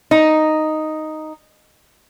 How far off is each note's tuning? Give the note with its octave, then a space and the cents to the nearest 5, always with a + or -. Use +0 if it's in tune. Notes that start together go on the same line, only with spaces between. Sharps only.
D#4 +0